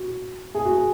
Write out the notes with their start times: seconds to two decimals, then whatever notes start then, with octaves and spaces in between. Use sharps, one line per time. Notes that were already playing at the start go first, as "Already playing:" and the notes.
Already playing: F#4
0.55 G#4
0.65 F#4
0.75 G#4